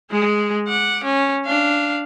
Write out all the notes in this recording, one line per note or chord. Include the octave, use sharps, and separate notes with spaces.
G#3 G#4
F#5 D6
C#4
D4 F5